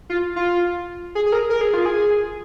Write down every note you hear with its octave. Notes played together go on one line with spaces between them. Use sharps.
F4
F4
G#4
G#4
A#4
A#4
G#4
F4
G#4